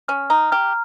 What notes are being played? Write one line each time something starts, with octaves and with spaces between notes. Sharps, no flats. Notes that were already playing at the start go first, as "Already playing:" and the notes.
C#4 F6
D#4 A#5
G4 F6